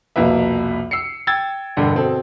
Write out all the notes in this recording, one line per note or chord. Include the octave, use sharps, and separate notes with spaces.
C2 F2 B2 A#3 B4 E5
E6 C7 C#7
G5 E6 G#6 A6
E1 G2 D3 F#5
B2 C4 A4